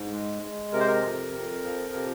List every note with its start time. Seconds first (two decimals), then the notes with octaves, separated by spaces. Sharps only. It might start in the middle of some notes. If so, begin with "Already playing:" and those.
Already playing: G#2
0.11 G#3
0.42 G#3
0.73 C3 A#4
0.80 C5
0.87 A#4
1.03 F2
1.34 F2
1.64 F3
1.94 C3